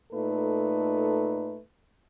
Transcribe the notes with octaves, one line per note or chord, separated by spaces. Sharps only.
A#2 A3 D#4 A4 B4